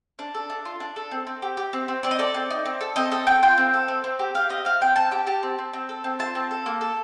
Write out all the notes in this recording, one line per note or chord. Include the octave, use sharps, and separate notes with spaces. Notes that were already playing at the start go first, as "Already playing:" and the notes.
D4
A4
D4
F4
D4
A4
C4
C4
G4
G4
C4
C4
C4 D5
D#5
A4 D5
C4
D#4
C4
A4
C4 D#5
A4 D#5
C4 G5
F4 G5
C4
A4
C4
C4
G4
G4 F5
C4 D#5
C4 F5
C4 G5
C4 A5
G4 G5
G4 A5
C4
C4
C4
A4
C4
F4 A5
C4
A4
A#3
A4